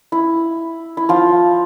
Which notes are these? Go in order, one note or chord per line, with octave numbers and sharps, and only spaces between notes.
E4
E4
F3 F4